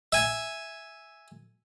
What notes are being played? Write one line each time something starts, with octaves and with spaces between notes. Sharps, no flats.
E5 G#5